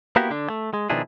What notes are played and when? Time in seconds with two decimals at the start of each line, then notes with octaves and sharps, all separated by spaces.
0.16 A#3 B3 E4 F#4 G4
0.31 D3 D4
0.50 A3
0.74 G#3
0.90 B2 D#3 F3 D4 E4 G#4